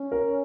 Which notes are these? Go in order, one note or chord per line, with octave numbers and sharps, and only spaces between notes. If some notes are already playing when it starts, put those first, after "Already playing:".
Already playing: C#4
A#4